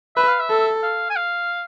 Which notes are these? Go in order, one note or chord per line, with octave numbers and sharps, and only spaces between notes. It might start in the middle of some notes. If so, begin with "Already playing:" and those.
B4 E5
F5
E5
A4
F5
G#5
F5